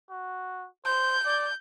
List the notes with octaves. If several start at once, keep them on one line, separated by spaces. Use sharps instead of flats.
F#4
C5 G6
D5